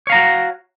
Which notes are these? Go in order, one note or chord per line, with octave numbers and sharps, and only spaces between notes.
F#4 C#5 F5 A#5